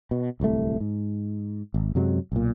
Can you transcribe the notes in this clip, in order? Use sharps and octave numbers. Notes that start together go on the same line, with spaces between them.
B2
D1 C2 C#3 A3
G#2
G#1
F#2 C3 F#3 G#3
B1 A#2